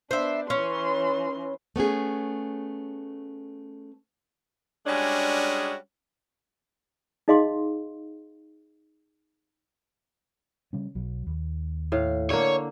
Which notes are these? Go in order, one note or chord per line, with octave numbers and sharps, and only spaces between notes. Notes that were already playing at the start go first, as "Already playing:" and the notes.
B3 D4 C5 E5
E3 C#4 C6
A3 B3 C#4 G#4
G3 G#3 C#4 D4 F#4 G#4
D#4 G#4 D#5 F5 C6 D6
C#3 G3 C#4
B1 F#3
D#2
A2 F5
D3 A#3 C#5